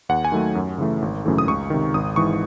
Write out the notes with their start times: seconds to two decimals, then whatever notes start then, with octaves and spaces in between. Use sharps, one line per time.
0.09 D#2 F#5
0.25 G#5
0.32 D#3 F#3 A3
0.55 F#2
0.78 C#3 E3 A3
1.02 G#1
1.25 F#2 C#3 E3 A3
1.38 D#6
1.48 C#2 C#6
1.70 C3 D#3
1.94 G#1 D#6
2.16 G#2 E3 C#6